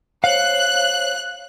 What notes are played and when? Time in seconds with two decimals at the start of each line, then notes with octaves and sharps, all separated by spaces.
0.24 C5 C#5 F5 F#6